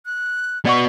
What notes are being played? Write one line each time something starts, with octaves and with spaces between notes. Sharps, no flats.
F#6
B3 F#4 D5 D#5 C#6